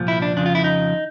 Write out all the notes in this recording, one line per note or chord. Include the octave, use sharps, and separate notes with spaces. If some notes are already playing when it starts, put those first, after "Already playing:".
Already playing: C2 A#2 F3
E4
D4
F2 C#3 F3 D4
F4
E4
D#4